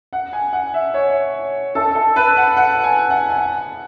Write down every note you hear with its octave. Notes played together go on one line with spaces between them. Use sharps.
F#5
G#5
F#5
E5
C#5
A4
A4
B4
F#5
F#5
G#5
F#5
G#5
F#5